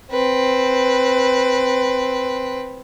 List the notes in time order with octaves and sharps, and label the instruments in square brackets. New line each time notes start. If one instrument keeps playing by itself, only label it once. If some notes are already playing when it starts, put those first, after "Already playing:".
[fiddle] C4 B4